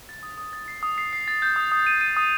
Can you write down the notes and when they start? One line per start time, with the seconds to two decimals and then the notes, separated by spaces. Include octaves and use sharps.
0.09 A6
0.23 D#6
0.38 D#6
0.53 A6
0.68 C7
0.83 D#6
0.98 C7
1.13 C7
1.28 A6
1.42 G6
1.56 D#6
1.72 D#6
1.87 D#7
2.01 D#7
2.17 D#6